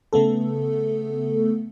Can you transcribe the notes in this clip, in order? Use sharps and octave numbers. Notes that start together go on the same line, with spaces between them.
C#3 A3 B3 A4